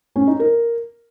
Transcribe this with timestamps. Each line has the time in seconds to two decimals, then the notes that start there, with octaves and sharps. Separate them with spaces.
0.16 C#4
0.28 D#4
0.39 A#4